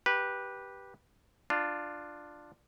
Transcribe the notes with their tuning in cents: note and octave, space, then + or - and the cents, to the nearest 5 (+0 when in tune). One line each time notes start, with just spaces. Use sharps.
G4 +0 B4 -15
D4 +10 F4 +0